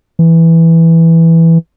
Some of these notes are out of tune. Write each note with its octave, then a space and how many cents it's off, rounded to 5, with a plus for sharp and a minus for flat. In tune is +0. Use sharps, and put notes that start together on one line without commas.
E3 +0